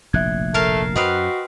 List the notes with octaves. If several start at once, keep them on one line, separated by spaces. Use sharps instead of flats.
F1 A#1 A2 E5 F#6 G#6
A3 A#4 F5 A5
F#2 C4 F#4 B4 D#5 F5 D#6 C7